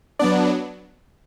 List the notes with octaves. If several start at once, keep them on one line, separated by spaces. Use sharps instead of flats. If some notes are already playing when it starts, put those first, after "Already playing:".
F#3 B3 D4 D5